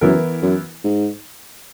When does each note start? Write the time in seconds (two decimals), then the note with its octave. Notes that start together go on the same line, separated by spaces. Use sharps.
0.01 F#2 E3 B3 E4 A#4
0.42 F#2
0.84 G#2